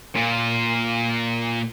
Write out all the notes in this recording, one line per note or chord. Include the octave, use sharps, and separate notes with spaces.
A#2 F4